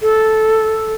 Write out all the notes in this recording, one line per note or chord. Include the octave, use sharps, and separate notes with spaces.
A4